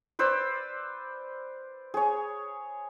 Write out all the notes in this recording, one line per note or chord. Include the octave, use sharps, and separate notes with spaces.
B4 C5 D5 E6
G#4 C#5